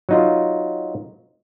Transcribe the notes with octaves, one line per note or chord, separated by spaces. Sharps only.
F#3 D#4 F4